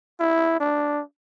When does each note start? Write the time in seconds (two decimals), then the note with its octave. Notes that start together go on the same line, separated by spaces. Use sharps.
0.20 E4
0.60 D4